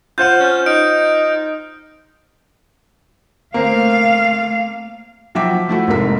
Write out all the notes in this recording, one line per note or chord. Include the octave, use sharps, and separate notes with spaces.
F4 C5 F#5 F6 G6
C#4
D#4 D7
A3 A#3 C4 A#4 F5
F3 F#3 E5 G5 D6 B6
F3 A3 E4 F#4
F1 G#2 A#3 A#4 B6